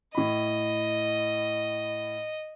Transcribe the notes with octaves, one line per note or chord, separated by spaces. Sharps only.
A2 D#5 B5